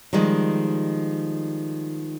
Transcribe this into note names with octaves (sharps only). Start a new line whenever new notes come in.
D#3 F3 G3 G#3